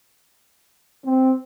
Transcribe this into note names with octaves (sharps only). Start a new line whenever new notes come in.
C4